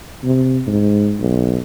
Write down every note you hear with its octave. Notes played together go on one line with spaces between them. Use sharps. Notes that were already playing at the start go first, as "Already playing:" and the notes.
C3
G#2
B1